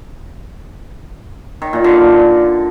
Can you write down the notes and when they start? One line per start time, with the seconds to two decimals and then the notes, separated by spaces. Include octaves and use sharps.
1.62 D#3
1.73 A#2
1.84 D3